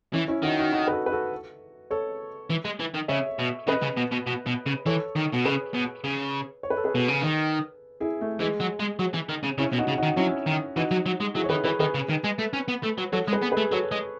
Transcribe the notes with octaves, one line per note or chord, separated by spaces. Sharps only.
E3 C#4 E4
C#4 E4
D#3 D#4 F#4
D#4 F#4
D#4 F#4
B4
F#4 A4
B4
F#4 A4
A4 C#5
E3
G#3
E3
D#3
C#3 C#5 E5
B2
C#3 B4 D#5
C#3
B2
B2
B2
B2
C#3
E3 A4 C#5
D#3
B2
C#3 G#4 B4
B2
C#3
C#5
B4
A4
G#4 B4
B2
C#3
D#3
E4 G#4
A3
E3 G#3
F#3
G#3
F#3
E3
D#3
C#3
C#3 C#4 E4
B2
D#4 F#4
C#3
D#4 F#4
D#3
F#3 C#4 E4
D#3
E3 D#4 F#4
F#3
F#3
G#3
F#3 E4 G#4
C#5
D#3 G#4 B4
E3 G#4 B4
D#3 G#4 B4
C#3
D#3
G#3
A3
C#4
B3
A3
F#3
F#3 A4 C#5
G#3
G#4 B4
B3
G#4 B4
A3
F#3 A4 C#5
G#3